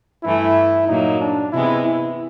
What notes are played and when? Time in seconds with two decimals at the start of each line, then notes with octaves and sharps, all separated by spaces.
0.23 G2 E3 A3 E4
0.88 A#2 F#3 A#3 D#4
1.21 D4
1.52 C3 E3 G#3 B3 E4
1.85 E4